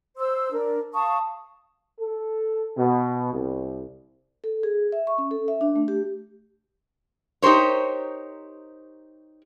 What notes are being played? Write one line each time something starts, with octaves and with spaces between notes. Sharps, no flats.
C5 C6 E6
D4 A#4
F5 A5 C#6 D#6
A4
B2
C2
A4
G#4
E5
C#6
C#4
A4
E5
D4
A3
G4
D#4 G4 A#4 C5 C#5